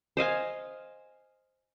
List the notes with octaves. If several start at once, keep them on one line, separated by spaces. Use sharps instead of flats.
C5 D#5 F5 G#5